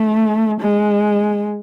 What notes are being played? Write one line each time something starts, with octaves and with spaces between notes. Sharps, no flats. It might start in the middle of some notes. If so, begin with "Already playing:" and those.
Already playing: A3
G#3